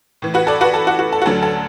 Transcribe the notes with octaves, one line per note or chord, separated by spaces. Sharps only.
A2 E3
F#4 B4
A4 D5
F#4 B4
A4
F#4
F#4
A4
F#4
D2 D3 F#3 A4
A4